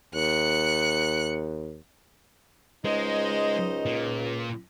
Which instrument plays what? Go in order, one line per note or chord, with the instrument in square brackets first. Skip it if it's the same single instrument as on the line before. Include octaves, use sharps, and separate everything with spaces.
[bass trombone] D#2 [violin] F#6 C#7
[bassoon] C#2 [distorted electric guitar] G#3 [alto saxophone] D#4 [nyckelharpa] C5 D#5
[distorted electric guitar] A#2